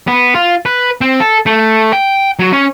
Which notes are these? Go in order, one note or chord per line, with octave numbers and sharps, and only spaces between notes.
B3
F4
B4
C4
A4
A3
G5
F#3
C#4